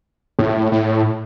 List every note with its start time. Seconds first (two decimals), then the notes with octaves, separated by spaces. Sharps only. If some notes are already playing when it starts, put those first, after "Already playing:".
0.39 A2
0.72 A2